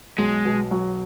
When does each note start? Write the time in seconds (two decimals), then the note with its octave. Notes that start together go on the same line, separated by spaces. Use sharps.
0.18 B1 G#3
0.45 B2
0.71 F#3